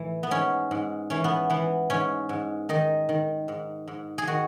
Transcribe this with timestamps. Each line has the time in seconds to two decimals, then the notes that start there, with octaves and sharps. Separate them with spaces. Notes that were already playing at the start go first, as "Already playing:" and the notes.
Already playing: A2 E3
0.23 B3
0.31 G#2 C#4
0.71 G#2
1.10 E3 C#4
1.24 B3
1.50 E3 B3
1.90 G#2 C#4
2.29 G#2
2.69 D#3 D#4
3.09 D#3
3.48 G#2
3.88 G#2
4.18 G#4
4.27 D#3 F#4